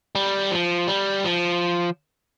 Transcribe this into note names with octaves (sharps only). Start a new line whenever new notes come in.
G3
F3
G3
F3